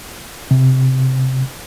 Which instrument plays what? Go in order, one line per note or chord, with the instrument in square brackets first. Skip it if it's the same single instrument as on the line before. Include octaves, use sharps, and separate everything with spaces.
[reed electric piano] C3